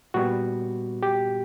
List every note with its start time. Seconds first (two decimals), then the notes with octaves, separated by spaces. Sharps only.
0.14 A#2 G3 B3 F#4
1.03 G4